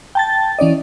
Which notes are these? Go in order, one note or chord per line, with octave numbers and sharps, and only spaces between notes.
G5 A5 A6
E3 C#4 D5 D#5